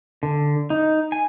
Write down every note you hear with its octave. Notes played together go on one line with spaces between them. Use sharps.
D3
D#4
G#5